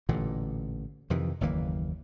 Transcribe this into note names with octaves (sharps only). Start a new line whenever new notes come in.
A1 A#2 D3 E3
F2 C3 D#3 E3
F#1 D#2 E3 A#3